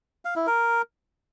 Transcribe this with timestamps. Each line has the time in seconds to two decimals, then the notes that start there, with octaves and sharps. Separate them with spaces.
0.25 F5
0.36 E4
0.47 A#4